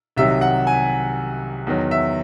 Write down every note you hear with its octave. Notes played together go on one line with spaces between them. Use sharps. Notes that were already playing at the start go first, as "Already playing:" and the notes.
C2 C3 D#3 F#3 E5
F#5
G#5
E2 D#3 F#3
E5